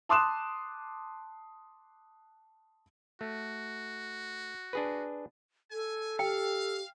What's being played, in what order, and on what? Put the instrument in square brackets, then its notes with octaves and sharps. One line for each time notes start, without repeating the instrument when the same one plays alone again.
[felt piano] A5 C6 D6 D#6 F#6 E7
[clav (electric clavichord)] A3 [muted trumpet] F#4
[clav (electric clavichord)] D4 G#4 B4
[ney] A4 [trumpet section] G#5
[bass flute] G4 [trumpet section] F5 [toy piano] G5